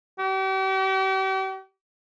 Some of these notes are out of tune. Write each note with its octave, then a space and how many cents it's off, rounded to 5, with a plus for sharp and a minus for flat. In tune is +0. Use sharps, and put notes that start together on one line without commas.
G4 -40